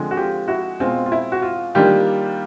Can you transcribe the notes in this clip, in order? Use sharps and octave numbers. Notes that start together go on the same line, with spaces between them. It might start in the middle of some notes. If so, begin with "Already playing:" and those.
Already playing: D3 F3 G#3 C4
F#4
F4 G4
E4 F#4
B2 G#3 C4 F4
F4
E4
F#4
F4
D#3 G3 A#3 D4 F4 G4